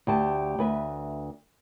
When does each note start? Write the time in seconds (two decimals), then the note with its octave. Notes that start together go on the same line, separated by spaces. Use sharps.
0.07 D2 G4 A5
0.59 D2 B4 E5